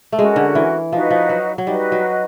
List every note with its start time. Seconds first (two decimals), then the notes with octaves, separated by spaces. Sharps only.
0.12 A3
0.18 G#3 C#4 F#4 A#4
0.36 D3
0.55 E3
0.93 F3 D#4 F#4 B4 D#5
1.10 F3
1.29 F#3
1.58 F#3
1.67 G3 D#4 F#4 B4 D#5
1.92 F#3